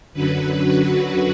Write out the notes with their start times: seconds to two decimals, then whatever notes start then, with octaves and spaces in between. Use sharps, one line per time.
0.14 F#2 D3 F#3 B4
0.61 F#4